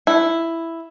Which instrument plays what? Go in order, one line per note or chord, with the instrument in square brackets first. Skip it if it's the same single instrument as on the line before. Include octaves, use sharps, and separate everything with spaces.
[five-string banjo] E4